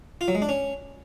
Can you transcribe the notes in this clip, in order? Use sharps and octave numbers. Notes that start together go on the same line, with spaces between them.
F4
F#3
G#3
D4
C#4